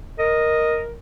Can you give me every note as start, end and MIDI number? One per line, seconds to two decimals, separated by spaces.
0.19 0.96 70
0.19 0.82 75